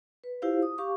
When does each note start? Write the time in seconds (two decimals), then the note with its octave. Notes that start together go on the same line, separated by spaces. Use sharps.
0.24 B4
0.42 E4 F4 G4 C5 F5
0.62 D#6
0.78 G4 F5 C#6 D6